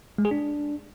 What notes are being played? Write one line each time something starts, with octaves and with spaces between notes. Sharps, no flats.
G#3
G#4
D4